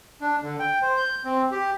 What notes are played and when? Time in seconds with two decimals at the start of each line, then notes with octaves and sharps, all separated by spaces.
0.21 D4
0.43 D3
0.59 G5
0.82 C5
0.97 G6
1.25 C4
1.52 G4